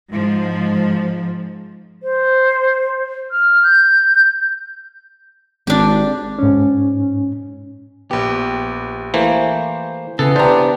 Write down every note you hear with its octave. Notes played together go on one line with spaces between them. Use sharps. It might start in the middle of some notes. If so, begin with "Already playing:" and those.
G#2 F3
C5
F6
G6
G#1 D4 G4
G#2 C#4
A#1 B3 G4
E3 A3 A#3 C5
C#3 E3 B3 A4
D4 G4 B4 C5 A#5